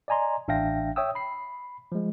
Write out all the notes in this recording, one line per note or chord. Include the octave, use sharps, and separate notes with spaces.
D5 D#5 G#5 A#5 C6
A1 D4 E5 F5 G5 A#6
C#5 E5 G5 D#6 E6
B5 C7
F3 G#3